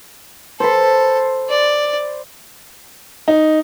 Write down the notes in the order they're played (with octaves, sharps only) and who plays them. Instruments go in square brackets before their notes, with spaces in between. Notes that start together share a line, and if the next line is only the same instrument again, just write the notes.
[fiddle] A4 [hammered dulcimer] C5 B5
[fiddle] D5
[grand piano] D#4